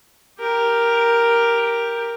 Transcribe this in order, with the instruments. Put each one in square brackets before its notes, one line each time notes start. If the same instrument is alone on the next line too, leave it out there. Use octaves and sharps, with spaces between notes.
[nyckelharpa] G4 A#4